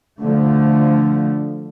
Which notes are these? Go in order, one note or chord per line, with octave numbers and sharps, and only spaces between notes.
D3 F3 A3